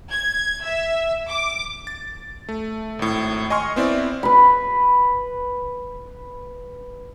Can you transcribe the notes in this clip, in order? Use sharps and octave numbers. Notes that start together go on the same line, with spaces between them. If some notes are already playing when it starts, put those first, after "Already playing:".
G#6
E5
D6
A6
A3
G#1 A2
D#5 G#5 C6 C#6 F6
B3 C4 E4 D5
B4 B5